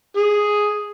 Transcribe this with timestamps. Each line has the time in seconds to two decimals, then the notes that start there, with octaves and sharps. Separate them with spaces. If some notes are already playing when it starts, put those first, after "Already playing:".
0.16 G#4